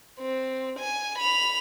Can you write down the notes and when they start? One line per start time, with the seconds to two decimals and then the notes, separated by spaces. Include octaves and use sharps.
0.19 C4
0.79 G#5
1.18 B5 F7